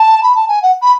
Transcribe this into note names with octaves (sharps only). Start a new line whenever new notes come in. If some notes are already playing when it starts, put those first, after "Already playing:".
Already playing: A5
B5
A5
G#5
F#5
B5